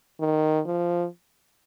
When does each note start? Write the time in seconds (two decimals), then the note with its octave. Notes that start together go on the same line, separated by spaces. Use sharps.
0.20 D#3
0.66 F3